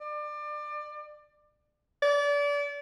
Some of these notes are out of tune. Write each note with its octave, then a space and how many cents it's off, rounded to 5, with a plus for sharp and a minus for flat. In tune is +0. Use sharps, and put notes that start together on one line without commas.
D5 +25
D5 -30